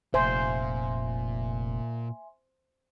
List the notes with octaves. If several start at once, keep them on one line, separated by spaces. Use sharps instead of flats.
F1 A#2 C5 E5 G#5 C6